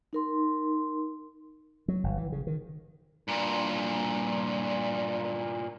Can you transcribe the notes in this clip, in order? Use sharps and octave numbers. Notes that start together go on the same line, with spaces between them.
D#4 A#4 C6
F#3
G1
E3
C#3
D#3
G2 A#2